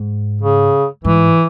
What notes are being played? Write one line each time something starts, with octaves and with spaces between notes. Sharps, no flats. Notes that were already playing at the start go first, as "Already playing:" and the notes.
Already playing: G#2
C#3
G#2 E3